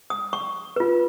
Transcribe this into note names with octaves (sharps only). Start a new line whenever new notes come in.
D#6
C#6
F4 B4